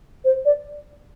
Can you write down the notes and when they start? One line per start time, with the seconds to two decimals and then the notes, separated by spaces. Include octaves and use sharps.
0.25 C5
0.45 D5